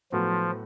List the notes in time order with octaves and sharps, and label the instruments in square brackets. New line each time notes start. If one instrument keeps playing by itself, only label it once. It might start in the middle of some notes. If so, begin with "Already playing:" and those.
[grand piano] A2 F#3 B3 F#4 A4 [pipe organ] F3